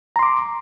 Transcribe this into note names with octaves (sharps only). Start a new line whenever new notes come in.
A#5 C6 D6